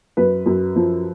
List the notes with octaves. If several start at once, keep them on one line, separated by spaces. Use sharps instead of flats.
F#2 B4
F#2
F3